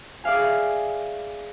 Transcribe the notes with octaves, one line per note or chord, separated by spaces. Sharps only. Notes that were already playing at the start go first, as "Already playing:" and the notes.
G#4 D5 E5 F5 G#5